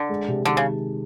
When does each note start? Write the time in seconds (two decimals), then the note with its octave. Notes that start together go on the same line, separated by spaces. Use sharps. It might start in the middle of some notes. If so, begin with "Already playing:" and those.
Already playing: D3
0.09 G#3
0.28 C3
0.45 D3 D#3
0.57 C#3